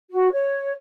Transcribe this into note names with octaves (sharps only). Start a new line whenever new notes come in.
F#4
C#5